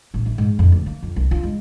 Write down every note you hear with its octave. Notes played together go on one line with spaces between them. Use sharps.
A1
E3
G#2
F2
D2
A#3
F2
C2
F4
G#3